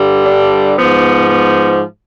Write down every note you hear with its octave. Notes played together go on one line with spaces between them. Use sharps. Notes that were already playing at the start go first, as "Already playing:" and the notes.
Already playing: G2 D3 G3
D4
G#2 F3 B3
B3